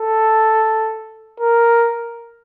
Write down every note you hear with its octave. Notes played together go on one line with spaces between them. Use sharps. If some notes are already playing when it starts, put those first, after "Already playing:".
Already playing: A4
A#4